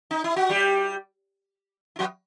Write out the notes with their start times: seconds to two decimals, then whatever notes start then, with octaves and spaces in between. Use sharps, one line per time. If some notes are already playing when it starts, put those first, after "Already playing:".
0.11 D#4
0.24 E4
0.36 F#4
0.49 G3 G4
1.96 E4
1.99 F#3 F#4